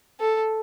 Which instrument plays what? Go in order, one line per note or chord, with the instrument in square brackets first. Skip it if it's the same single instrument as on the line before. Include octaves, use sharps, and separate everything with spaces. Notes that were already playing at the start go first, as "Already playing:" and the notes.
[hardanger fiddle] A4